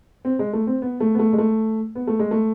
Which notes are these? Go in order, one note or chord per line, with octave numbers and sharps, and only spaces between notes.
C4
G#3
A3
C4
B3
A3
B3
A3
G#3
A3
B3
A3
G#3
A3